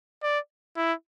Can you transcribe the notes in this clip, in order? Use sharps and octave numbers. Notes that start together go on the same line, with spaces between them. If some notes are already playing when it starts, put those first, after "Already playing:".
D5
E4